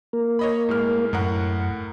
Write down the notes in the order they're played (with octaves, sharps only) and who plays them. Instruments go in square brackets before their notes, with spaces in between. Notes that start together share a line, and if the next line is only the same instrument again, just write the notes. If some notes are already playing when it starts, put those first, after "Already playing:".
[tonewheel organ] A#3 A#4
[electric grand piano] C#5 D#5 B5
A2 G#3 F6
[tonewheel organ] F#2 [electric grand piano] A2 A#4 F#5